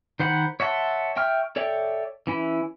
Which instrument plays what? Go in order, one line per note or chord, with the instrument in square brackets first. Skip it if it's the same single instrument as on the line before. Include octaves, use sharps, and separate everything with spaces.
[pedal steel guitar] D#3 C5 F#5 B5
C#5 E5 F#5 A5 C6
E5 G5 C#6 F6
A4 C#5 D5 E5 G5
E3 C#4 E4